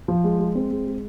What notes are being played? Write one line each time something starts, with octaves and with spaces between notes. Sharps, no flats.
F3
G#3
G#3
C4
G#3
G#3